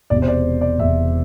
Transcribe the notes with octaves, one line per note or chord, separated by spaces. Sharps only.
E1 E2 C3 D5
C5
D5
D5
E1 E2 C3 E5